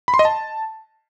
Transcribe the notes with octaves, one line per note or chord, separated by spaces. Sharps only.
B5
C6
D#5
A5